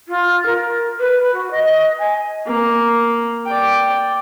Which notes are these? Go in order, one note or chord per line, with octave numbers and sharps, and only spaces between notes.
F4
A#4
B4
F#4
D#5
G#5
A#3
D5 G5